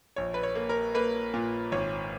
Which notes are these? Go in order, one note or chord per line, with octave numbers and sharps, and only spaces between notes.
A#1 C#5
B4
C#5
A#3
A#4
A#3 B4
A#2
G#1 C#5